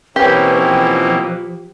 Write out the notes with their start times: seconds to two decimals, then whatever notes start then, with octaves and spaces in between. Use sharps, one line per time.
0.16 B2 E3 A#3 C4 C#4 G4 B4 C#5
0.61 F3